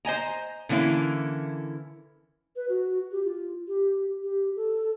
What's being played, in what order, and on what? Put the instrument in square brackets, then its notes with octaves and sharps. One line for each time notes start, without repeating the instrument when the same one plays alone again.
[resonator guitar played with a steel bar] C5 D#5 G#5 A#5
D3 E3 A#3 C#4 E4
[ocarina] B4
F#4
G4
F4
G4
G4
A4